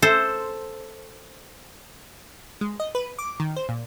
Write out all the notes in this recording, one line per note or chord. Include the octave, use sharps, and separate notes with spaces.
A4 C5
G#3
D#5
B4
D6
D#3
C5
A#2